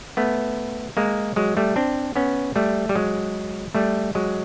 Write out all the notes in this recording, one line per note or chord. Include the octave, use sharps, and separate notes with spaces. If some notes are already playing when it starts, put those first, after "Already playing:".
A3 B3
G#3 A#3
F#3 G#3
G3 A3
C4 D4
B3 C#4
G3 A3
G3
F#3 G#3
G3 A3
F#3 G#3